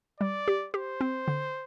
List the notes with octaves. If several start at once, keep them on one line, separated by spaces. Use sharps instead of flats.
G3 D5
G4
G4 C5
C4
D3